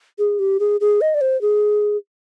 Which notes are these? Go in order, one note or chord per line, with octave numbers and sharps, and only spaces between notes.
G#4
G4
G#4
G#4
D#5
D5
C5
G#4